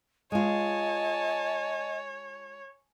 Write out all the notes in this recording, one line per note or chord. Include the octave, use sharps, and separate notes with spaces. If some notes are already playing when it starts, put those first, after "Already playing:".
G#3 F4 C#5 D#5 G#5 A5